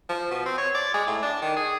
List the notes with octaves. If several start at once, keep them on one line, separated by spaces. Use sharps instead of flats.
F3
B2
C4
C#5
D5
G#3
A2
D4
D#3
G#4